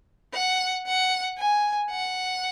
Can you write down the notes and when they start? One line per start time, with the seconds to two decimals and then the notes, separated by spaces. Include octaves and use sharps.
0.34 F#5
0.87 F#5
1.39 G#5
1.91 F#5